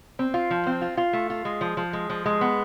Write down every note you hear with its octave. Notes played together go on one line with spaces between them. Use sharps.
C4
F4
F3
C4
F4
F4
A3
F4
G#3
F3
F3
G#3
F3
G#3
B3